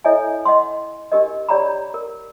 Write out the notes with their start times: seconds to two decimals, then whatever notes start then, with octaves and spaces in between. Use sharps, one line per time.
0.04 E4 A4 C#5 D#5 E5 G#5
0.45 D#5 F#5 C6
1.12 D4 G4 A#4 D#5
1.49 G4 C#5 D5 G5 A#5 B5
1.94 A#4